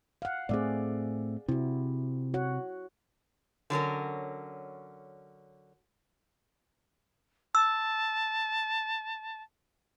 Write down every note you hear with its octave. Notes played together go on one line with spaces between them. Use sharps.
F5 F#5
A2 A3 C4 G#4 D5
C3 E4 F#4
F#4 C#5 F#5
D3 F#3 C#4 A#4
A5 E6